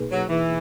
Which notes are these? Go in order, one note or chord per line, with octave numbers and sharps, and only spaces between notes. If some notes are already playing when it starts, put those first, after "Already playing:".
Already playing: B2 A#3 D#4 G#4 B4
F#3
E3